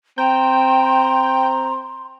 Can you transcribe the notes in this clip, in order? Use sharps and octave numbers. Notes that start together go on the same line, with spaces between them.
C4 G5 A#5 C6